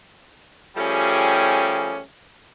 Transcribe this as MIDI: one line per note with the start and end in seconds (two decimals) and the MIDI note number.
0.77 1.99 53
0.77 1.99 55
0.77 1.99 57
0.77 1.99 61
0.77 1.99 67
0.77 1.99 68